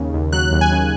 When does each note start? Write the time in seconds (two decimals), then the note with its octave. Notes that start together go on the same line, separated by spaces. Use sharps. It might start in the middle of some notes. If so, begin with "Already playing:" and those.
Already playing: D#2 C#3
0.14 D#2
0.33 F#3 F#6
0.52 D#2
0.61 G#5
0.72 C#3